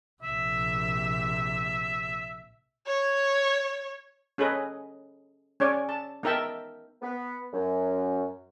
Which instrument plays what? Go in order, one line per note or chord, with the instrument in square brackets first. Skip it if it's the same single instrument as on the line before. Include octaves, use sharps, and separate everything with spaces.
[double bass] A#1 C3 [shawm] E5
[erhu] C#5
[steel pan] C#4 G#4 A4 B4 D#5
C#4 C#5 D5 G#5
A5
B3 D#4 A#4 E5 G5 A5
[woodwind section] B3
F#2